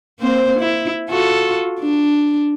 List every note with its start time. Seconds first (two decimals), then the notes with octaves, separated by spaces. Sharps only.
0.19 A#3 C4 C5
0.59 E4
1.09 F4 F#4 A4
1.81 D4